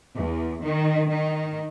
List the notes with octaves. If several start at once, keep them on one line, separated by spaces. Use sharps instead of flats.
E2
D#3
D#3